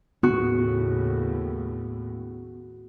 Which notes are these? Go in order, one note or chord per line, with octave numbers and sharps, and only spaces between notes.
D#2 A2 C#3 B3 F#4